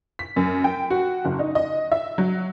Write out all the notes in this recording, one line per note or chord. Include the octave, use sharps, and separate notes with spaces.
B6
F#2
G5
F#4
F#1
D#4
D#5
E5
F#3